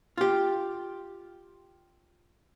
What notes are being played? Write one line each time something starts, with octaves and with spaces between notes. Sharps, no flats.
F4 G4